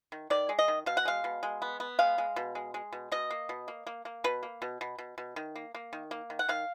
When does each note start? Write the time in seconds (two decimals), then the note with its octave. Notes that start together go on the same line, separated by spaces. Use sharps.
0.12 D#3
0.30 D#3 D5
0.49 G#3
0.59 D#5
0.68 D#3
0.86 B2 F5
0.97 F#5
1.05 G#3 F5
1.24 B2
1.43 G#3
1.62 B3
1.80 B3
1.99 G#3 F5
2.18 G#3
2.36 B2
2.55 G#3
2.74 G#3
2.92 B2
3.12 B2 D#5
3.30 A#3
3.49 B2
3.68 A#3
3.87 A#3
4.05 A#3
4.24 B2 B4
4.43 A#3
4.62 B2
4.81 B2
4.98 B2
5.18 B2
5.36 D#3
5.55 A#3
5.75 A#3
5.93 D#3
6.11 A#3
6.30 D#3
6.39 F#5
6.49 D#3 F5